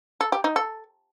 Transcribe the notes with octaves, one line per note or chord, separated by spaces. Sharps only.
A4
G4
D#4
A4